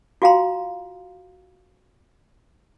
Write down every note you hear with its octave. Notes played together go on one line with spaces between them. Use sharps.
F4 F#4 F5 G5 A#5 C6